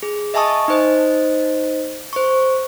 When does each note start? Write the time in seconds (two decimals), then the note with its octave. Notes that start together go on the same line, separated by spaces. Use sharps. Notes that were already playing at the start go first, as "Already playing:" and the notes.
0.03 G#4
0.34 D#5 E5 G#5 A5 C#6 D#6
0.68 D#4 C5 D#5
2.13 C5 C#6